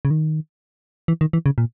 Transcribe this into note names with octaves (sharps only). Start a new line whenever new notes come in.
C#3
D#3
E3
D#3
E3
C#3
A#2